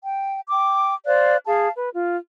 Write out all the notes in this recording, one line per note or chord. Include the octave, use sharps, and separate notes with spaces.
G5
G5 D6
C5 D5 F5 F#6
G#4 F5 A5
B4
F4